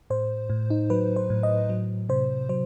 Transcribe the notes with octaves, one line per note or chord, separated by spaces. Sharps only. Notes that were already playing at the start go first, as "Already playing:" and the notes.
A2 C5
A2
D#4
F#3 B4
C5
A2
D#5
F#3
C3 C5
F#3 C5